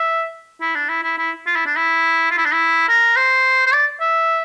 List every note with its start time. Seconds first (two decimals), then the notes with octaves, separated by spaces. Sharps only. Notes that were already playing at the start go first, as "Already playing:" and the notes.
Already playing: E5
0.61 E4
0.75 D4
0.89 E4
1.03 E4
1.18 E4
1.46 F4
1.56 E4
1.66 D4
1.76 E4
2.31 F4
2.38 E4
2.45 D4
2.52 E4
2.88 A#4
3.16 C5
3.66 C5
3.72 D5
4.01 E5